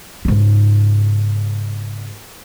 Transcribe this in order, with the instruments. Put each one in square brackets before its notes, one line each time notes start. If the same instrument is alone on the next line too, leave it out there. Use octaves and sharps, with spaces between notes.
[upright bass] G#2 C#3